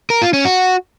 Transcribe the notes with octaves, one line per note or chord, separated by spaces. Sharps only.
A#4
F4
C#4
F#4